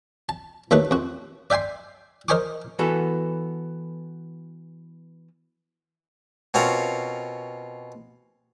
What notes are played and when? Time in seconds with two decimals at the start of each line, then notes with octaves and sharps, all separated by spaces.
0.29 A5
0.71 D#2 F#3 A3 D#4 A4 B4
0.91 F2 F#4
1.50 D5 E5 G5 G#5 C6
2.28 A#4 C5 D#5 G#5 C#6 D6
2.79 E3 B3 F#4 A4
6.54 B2 C4 C#4 F4 A#4